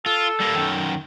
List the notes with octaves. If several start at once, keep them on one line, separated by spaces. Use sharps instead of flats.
F4 A4
G3 A#3
F#2 D#3